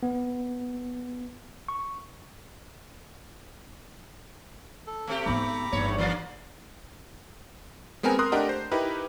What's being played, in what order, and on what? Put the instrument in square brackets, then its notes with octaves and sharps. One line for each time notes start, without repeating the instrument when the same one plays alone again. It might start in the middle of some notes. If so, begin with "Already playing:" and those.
[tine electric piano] B3
C#6
[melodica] A4
[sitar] A3 C4 G4
[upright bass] G#2 B3 [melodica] A#5 B5 D6
[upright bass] G1 D#4 [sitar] E2 A2 C#5
[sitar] E3 A#3 D4
[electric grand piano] G#3 B3 C4 A#4 G#5
A#4 C6 D#6 F#6
A3 D4 G4 A#4 D#5 F#5
C5
D#4 E4 G4 A#4 B4